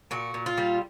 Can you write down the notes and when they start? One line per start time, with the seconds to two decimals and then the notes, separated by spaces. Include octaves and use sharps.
0.11 A#2 F#4
0.34 A#2
0.46 F4
0.58 G3